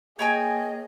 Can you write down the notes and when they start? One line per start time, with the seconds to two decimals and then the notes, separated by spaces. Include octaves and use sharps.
0.19 A#3 G#4 C#5 D#5 G5 G#5